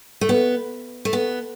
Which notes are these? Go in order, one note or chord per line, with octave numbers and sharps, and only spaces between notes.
A3
B3
A3
B3